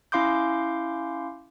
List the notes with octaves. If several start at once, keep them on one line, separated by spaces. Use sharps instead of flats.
C#4 E4 F5 C6 D6 G6